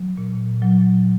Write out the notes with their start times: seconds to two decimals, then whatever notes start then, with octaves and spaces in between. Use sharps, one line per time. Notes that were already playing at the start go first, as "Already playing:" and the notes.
Already playing: F#3
0.18 A#2
0.62 A#2 F#3